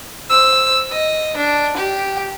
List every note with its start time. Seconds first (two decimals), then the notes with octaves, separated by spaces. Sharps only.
0.30 C5 E6
0.92 D#5
1.37 D4
1.77 G4